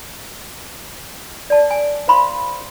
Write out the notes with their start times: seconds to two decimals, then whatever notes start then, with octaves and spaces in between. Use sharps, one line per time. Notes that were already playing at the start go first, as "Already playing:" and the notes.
1.50 D5 A5
1.71 G#5
2.08 C5 F5 B5 C6